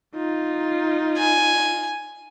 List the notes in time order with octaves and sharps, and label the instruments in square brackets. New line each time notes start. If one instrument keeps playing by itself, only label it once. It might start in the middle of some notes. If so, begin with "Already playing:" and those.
[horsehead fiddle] D#4 F4
[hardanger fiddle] G#5